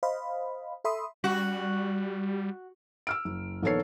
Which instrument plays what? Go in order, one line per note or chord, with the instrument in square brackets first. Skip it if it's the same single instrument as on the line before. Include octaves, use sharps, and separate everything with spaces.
[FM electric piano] C5 D#5 F5 B5
A4 E5 B5 C6 D#6
[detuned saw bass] G3 [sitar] F#4
[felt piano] E6 F6 D7
F#1
A#1 D#3 B3 A4 C#5 C7